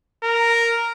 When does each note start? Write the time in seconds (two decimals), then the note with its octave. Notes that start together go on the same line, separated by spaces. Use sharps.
0.23 A#4